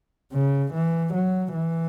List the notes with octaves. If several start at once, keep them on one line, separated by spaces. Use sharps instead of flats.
C#3
E3
F#3
E3